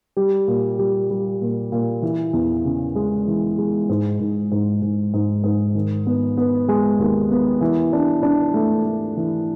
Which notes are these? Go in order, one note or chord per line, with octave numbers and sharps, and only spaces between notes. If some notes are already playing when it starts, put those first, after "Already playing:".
G3
A#2
G3
G3
A#2
A#2
E3
E2
C#3
G#3
E3
G#3
G#2
G#2
G#2
G#2
G#2
G#2
D#3
B3
B3
G#3
D#2
B3
E3
D4
D4
A3
A3
E3